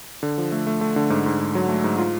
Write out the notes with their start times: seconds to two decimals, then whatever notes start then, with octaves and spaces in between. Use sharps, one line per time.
0.23 D3
0.38 F3
0.52 A3
0.67 A3
0.81 A3
0.96 D3
1.10 G#2
1.26 G#2
1.41 G#2
1.55 F#3
1.69 A3
1.84 G#2
1.98 F4